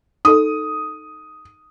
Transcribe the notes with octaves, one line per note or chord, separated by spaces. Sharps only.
D#4 A4 D#6